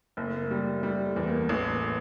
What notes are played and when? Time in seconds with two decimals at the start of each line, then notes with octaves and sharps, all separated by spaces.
0.17 F#1 A#3
0.27 A3
0.37 A#3
0.51 G3
0.83 G3 A3
1.06 A3
1.16 E2
1.23 B3
1.28 A#3
1.43 A#3
1.49 A1 A3
1.71 A#3